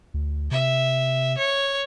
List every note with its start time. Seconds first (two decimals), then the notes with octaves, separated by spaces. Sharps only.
0.14 D2
0.51 C3 E5
1.38 C#5